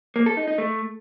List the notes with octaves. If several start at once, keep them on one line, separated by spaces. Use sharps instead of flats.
A#3
A4
D#4
D#4
A3